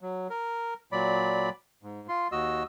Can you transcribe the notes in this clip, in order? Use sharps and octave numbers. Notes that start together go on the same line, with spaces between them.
F#3
A#4
A#2 F#3 D5 B5
G#2
F4 C6
D#2 F#4 D#5 E6